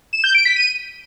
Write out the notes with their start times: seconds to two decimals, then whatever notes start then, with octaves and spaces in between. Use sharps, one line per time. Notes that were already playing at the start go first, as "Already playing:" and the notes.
0.13 E7
0.24 G6
0.35 D7
0.45 B6
0.56 D#7